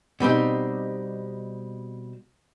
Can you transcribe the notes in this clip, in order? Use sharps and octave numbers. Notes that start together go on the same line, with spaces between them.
B2 G3 C4 D#4